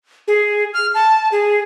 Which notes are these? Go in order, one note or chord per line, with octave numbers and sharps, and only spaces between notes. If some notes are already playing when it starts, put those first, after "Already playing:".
G#4
F6
A5
G#4